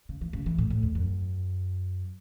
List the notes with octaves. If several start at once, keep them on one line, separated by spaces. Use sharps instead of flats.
C#3
E3
C#3
E3
A2
A2
E2
F#2